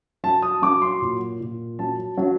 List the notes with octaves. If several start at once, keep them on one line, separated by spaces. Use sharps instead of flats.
F#3 A5
D#6
F#3 D6
C6
A#2
A#2
F#3 A5
F#3